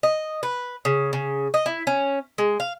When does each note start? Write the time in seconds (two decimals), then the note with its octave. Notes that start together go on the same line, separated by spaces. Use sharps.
0.03 D#5
0.43 B4
0.85 C#3
1.13 C#3
1.54 D#5
1.66 E4
1.87 C#4
2.38 G#3
2.60 F5